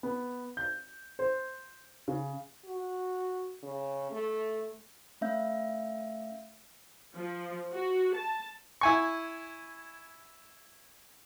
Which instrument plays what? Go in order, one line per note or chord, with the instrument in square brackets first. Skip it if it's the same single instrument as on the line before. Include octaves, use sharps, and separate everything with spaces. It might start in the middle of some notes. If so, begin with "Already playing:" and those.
[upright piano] B3
G6
C5
C#3
[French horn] F#4
C#3
A3
[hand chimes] A3 C#4 E5 F5 G6
[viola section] F3
F#4
A5
[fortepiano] E4 G#5 C#6